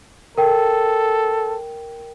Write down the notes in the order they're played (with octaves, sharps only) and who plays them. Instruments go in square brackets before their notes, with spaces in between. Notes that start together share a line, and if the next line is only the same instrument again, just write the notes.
[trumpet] A4 [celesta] A#4 G5